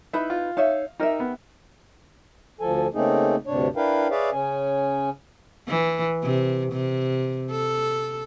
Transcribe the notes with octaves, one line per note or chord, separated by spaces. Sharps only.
D#4 E4 B4 E5 B5
F4
D#4 C#5 E5 F5
D#4 G4 A#4 E5
B3
D2 F3 A4 G#5
C#3 A3 A#3 C4 D#4 G#4
D2 G2 C3 D4 C#5
D4 E4 A#4 B4 F5 G5
G#4 B4 C#5 D5 E5 F5
C#3 C#4 G#5
E3
C3
C3
A4